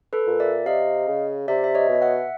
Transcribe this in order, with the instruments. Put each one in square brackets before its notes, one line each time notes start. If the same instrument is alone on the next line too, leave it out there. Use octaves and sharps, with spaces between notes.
[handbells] A4 B4
[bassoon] A#2
[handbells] D5 E5
[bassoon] C3 [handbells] D#5 F5
[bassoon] C#3
[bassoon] C3 [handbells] D5 E5
[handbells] E5
C#5 D#5
[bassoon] B2
[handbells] E5 F#5